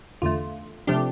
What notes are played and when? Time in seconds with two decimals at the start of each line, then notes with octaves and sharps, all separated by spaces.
0.22 E2 D3 A3 F4
0.87 C3 F3 A3 D4 G4